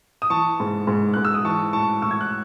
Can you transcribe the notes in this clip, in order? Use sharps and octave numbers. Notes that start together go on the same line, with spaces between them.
D#6
E3 A5 C#6
G#2
G#2
G#2 F#6
E6
D#6
E3 A5 C#6
A2 A5 C#6
A2 C#6 E6
G#6
F#6